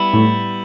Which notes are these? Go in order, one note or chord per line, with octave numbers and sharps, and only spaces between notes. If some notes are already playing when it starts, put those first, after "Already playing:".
Already playing: G3 B3 E4
A2